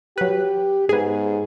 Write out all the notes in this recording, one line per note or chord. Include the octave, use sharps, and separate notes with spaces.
F#3 G4 B4
G#2 B3 G#4